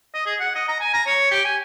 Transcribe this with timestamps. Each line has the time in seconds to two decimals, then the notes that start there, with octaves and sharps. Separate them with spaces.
0.14 D#5
0.26 G#4
0.40 F#5
0.55 D#5
0.68 A#5
0.80 G#5
0.94 A#5
1.06 C#5
1.31 G4
1.45 G#5